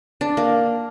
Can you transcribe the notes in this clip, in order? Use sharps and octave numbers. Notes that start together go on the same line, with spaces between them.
D4
A#3